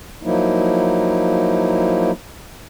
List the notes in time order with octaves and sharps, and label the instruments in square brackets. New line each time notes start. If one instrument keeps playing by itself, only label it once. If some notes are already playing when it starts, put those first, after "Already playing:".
[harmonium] F3 F#3 A#3 D#4 E4